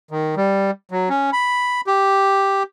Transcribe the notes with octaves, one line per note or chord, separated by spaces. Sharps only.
D#3
G3
F#3
C#4
B5
G4